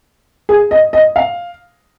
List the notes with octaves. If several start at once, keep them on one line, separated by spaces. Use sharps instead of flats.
G#4
D#5
D#5
F5